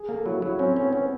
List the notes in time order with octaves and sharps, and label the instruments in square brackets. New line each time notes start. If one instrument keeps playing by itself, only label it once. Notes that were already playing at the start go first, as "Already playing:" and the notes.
Already playing: [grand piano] G#4
[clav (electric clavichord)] A#3 [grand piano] A4
[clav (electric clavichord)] F#3 [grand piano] E4
[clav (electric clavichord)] F#3 [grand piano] E4
[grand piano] C4 [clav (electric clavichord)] C#4
[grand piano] B3 [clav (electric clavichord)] C#4
[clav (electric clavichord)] C#4